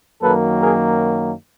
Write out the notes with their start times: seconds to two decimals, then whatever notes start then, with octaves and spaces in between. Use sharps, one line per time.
0.21 F#2 D#3 F#3 A#3 A4 B4
0.60 G#4 A#4